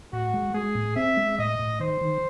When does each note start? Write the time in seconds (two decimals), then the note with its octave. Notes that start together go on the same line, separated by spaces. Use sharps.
0.13 A2 F#4
0.34 G#3
0.54 G#3 G#4
0.75 A2
0.96 C4 E5
1.17 G#3
1.39 A2 D#5
1.59 A2
1.80 D#3 C5
2.01 D#3